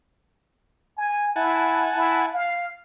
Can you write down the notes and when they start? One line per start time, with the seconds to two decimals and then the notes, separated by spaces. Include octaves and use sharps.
0.98 G#5
1.36 E4 F#5 G#5 A5
1.96 E4
2.33 F5